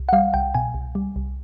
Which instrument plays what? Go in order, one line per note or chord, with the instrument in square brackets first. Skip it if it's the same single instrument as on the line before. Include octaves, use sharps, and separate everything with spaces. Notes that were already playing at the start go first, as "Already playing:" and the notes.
Already playing: [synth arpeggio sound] C2
F#5
G3 F5
C2 G5
B2 G#5
C2
G3
C2